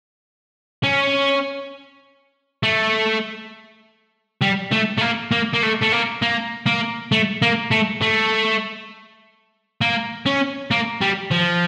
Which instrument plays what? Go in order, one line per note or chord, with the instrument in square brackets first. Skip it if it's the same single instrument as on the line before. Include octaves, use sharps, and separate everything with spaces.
[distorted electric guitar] C#4
A3
G3
A3
A3
A#3
A#3
A#3
A3
A3
A#3
A#3
A#3
A3
A#3
A3
A3
A#3
C#4
A#3
G3
F3